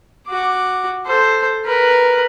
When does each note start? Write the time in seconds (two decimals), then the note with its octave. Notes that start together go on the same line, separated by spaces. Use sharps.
0.27 F#4 D6
1.06 A4 C5
1.65 A#4 B4